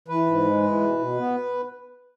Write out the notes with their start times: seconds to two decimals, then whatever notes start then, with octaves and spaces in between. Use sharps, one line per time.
0.08 E3 B4
0.26 G#2
0.45 G#3
0.63 E3
0.81 B2
0.99 B2
1.17 B3